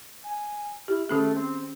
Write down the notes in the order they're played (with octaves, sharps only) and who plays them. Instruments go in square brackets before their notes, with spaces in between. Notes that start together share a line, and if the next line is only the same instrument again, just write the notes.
[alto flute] G#5
[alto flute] E4 [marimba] G4
[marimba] D#3 C#4 G#4 [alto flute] A3
[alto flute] C4